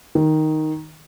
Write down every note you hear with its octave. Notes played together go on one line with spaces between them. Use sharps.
D#3